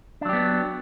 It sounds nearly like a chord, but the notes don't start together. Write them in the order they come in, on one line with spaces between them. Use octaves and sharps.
D4 F#3 G4 B3